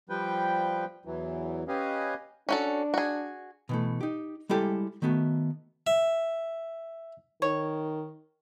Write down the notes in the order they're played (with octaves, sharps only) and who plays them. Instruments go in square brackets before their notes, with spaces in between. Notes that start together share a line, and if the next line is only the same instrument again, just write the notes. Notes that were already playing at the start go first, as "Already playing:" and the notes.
[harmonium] F3 G3 B4 G5
E2 E3 F#3
C#4 G4 B4 D#5 F5 G#5
[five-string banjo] C#4 F#4 A4 [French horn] D4
[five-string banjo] F#4 G#4
[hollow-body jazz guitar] B2 E3 A3
D#4 G4
G3 G#3 E4 G4 A4
D#3 A3 B3 F#4
[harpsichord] E5
[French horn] D#3 [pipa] C#5